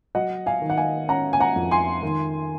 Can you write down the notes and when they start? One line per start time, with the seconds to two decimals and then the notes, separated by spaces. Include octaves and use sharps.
0.15 F#3 D#5 F#5
0.46 F5 G#5
0.62 D#3
0.70 F#5
0.77 F5 G#5
1.09 C#4 F#5 A#5
1.33 G#5
1.40 F#5 A#5
1.56 F2
1.71 G#5 C6
2.03 D#3